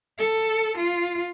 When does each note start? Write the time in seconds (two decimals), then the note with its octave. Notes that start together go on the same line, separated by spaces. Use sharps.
0.19 A4
0.77 F4